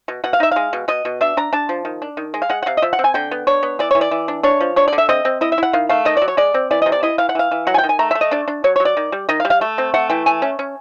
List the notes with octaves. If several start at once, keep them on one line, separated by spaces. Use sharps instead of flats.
B2
B2 F#5
F5
D#4 E5
G#3 F5
B2
B2 D#5
B2
D4 E5
D4 A#5
D4 A5
F3
D#3
D4
D#3
G#3
F5
G#3 F#5
F#5
C3 F5
D#5
F3 E5
F#5
C4
G#5
D3 G5
B3
D4 C#5
B3
E3 D5
E3 C#5
D5
E3
D4
D4 C#5
F3
D4 C#5
D5
D3
E5
C4 D#5
C4
E4 D#5
E5
E4 F#5
D#3 F5
A3 F5
D#3 D#5
D5
F#3
C#5
G#3 D5
C4
E3 D5
C3 D#5
D5
E4 D#5
E3 F5
F#5
E3 F5
E3
F#3 F#5
G#5
G5
D#3
G#5
A3 A#5
A3 E5
D#5
D4 D5
D4
F#3 C#5
C#5
F#3
D5
D#3
G3
D#3 D#5
F5
G3
F5
A3
C4
A3 F#5
E3 G5
A3 G#5
C#4
C#4